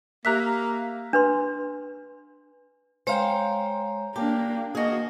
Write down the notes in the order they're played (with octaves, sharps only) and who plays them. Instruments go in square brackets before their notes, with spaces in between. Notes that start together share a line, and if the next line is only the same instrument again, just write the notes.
[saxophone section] A#3 [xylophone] G4 F#6 B6 [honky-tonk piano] E5 A#5
[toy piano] D4 B4 C6
[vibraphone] G#3 C#5 A#5 [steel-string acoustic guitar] C5 F5 G5
[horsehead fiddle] A#3 D4 [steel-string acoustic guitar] G4 [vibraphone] A5
[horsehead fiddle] A#3 D#5 [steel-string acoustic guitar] F#4 G#4